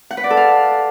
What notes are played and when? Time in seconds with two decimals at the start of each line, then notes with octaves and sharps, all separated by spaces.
0.11 F#5
0.17 B4
0.24 D5
0.30 A4
0.37 F5